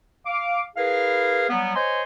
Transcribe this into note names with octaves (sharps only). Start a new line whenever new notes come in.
F5 D6
E4 G#4 A#4 B4 F5
F#3 G3 B3
C5 C#5 D#5 G#5 C6